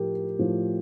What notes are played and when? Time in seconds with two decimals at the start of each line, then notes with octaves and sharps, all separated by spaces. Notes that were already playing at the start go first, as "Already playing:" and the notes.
Already playing: A2 F3 A3 G4 A#4
0.39 A2 F3 A3